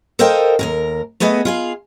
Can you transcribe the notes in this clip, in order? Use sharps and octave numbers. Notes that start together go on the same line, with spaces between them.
A4 A#4 C5 D#5 F5 G5
D#2 G#2 A#4
A3 B3 G#4 B4 D#5
F4 G#4 F5